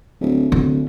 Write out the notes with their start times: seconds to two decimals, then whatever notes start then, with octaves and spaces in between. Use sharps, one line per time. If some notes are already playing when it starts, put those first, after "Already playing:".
0.21 D1
0.52 D1 D3